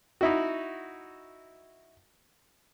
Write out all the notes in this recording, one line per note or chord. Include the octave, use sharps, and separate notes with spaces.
D#4 E4 F#4